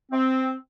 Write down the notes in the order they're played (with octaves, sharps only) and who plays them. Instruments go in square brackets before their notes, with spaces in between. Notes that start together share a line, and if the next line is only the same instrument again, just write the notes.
[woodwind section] C4